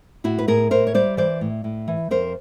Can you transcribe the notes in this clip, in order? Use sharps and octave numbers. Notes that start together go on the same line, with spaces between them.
A2 E4 F#4
B4
A2 G#4 A#4
A2 A#4 C5
C#5
G3 C5 D5
E3 C5 D5
A2
A2
E3
F2 A#4 C5